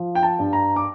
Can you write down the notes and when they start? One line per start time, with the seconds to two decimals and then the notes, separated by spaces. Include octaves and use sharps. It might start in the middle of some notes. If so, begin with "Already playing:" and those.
Already playing: F3
0.15 G5
0.23 A5
0.39 G2
0.53 A#5
0.76 D6